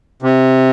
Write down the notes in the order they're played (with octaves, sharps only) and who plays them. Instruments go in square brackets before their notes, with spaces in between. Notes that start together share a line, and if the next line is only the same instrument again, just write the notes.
[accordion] C3